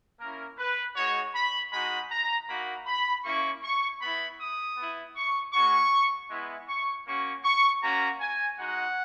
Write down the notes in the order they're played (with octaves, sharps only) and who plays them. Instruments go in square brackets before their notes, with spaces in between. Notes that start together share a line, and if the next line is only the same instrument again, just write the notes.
[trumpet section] A#3 C#4 E4 A#4
B4
G#3 D#4 F#4 C#5
B5
G#3 D#4 F#4 B5
A#5
A#3 D#4 F#4 B5
B5
A#3 C#4 E4 C#6
C#6
B3 E4 B5
D#6
B3 E4
C#6
G#3 C#4 F#4 C#6
G#3 B3 E4
C#6
A#3 C#4 F#4 C#6
C#6
A#3 C#4 F#4 A#5
G#5
G#3 D#4 F#4 F#5